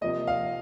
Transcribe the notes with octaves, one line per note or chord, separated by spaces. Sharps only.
C3 F3 A#3 D#5
F5